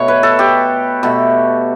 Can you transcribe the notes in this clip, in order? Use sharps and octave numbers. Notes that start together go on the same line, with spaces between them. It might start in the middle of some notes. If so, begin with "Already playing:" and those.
Already playing: B2 A3 C#5
B4
A4
G4
B2 A3